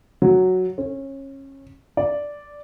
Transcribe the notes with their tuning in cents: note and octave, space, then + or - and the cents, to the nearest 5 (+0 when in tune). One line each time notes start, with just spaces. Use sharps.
F#3 +0
C#4 -25
D5 -5